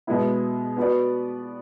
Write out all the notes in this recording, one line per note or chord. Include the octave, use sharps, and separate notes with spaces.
B2 G#3 B3 E4
B3 F#4 B4 D5